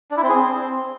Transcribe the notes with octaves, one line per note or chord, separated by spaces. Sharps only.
D4
E4
C4
G#4
C4